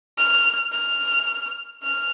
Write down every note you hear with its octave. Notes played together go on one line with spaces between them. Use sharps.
F6
F6
F6